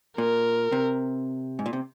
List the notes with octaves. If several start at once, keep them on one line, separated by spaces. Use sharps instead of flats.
A#2 A#4
C3
G#2
A#2
C3